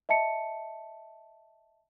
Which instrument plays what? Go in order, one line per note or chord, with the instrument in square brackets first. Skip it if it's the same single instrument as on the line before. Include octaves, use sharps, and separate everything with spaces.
[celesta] D#5 E5 A5 C#7